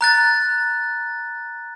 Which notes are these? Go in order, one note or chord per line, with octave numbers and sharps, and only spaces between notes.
A#5 F#6 A6